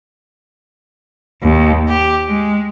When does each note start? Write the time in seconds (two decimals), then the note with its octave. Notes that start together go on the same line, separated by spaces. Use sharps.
1.42 D#2
1.88 G4
2.28 G#3